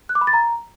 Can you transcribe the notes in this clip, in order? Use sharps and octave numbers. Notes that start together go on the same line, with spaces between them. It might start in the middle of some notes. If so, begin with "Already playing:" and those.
F#6
D6
B5
A6
A#5